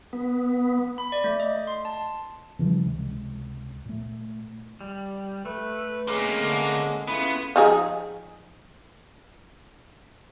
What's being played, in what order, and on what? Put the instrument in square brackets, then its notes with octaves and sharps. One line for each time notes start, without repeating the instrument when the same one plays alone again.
[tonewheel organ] B3
[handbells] B5
D5
A3
D#5
C6
A5
[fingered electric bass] C#3 E3 F3 G3
C#2 C3 G#3
A#2 A3
[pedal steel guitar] G3
[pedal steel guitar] A3 [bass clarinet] B4
[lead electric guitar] C3 A#3 [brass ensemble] G#3 C#4
[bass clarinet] D3
[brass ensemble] A3 E4 F4 [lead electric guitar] B3 [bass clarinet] C#4
[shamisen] F3 D#4 G#4